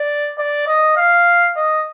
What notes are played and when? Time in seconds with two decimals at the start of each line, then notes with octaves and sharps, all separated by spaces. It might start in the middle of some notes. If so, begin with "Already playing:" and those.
Already playing: D5
0.38 D5
0.67 D#5
0.97 F5
1.56 D#5